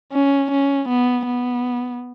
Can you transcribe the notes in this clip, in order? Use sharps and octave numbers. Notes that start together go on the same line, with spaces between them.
C#4
C#4
B3
B3